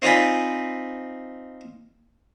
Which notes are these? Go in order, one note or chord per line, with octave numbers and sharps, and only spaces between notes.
C4 D#4 F4 D5 G#5 B5